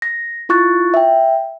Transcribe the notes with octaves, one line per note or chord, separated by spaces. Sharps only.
A#6
E4 F4 C#6 F#6 A6
E5 G5